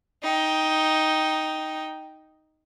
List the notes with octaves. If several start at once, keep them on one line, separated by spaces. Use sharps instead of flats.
D#4 G5